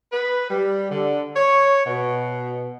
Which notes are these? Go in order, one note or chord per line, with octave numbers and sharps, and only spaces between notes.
B4
G3
D3
C#5
B2